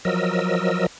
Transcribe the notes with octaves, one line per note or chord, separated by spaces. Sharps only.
F3 F#3 A#4 D#5 E6